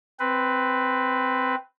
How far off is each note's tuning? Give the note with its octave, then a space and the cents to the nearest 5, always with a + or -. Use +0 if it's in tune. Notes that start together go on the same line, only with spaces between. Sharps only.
C4 +0 B4 +10